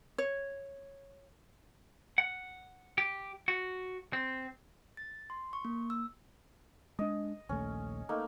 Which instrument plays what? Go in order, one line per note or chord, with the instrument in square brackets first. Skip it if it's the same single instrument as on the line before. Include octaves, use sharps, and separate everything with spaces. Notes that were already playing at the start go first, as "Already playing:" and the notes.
[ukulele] C#5
[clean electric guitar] F#5
G4
F#4
C4
[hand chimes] A6
C6
C#6
A#3
E6
[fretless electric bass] G#3 D4 [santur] D#5
[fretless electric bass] A#1 D#2 A3 [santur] C#4
[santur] A3 A#3 D#4